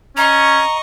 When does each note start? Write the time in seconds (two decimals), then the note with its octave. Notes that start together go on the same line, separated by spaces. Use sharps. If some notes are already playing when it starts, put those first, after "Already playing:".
0.17 C#4 D#5 A#5 C#6